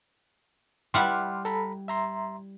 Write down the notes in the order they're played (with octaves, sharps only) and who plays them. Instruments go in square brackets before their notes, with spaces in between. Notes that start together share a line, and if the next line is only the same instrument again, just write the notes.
[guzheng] G3 E4 F#5 [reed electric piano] C6 D6 F6
[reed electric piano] A4 A#5 B5
E5 A#5 C6